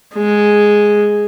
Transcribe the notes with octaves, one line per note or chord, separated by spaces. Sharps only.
G#3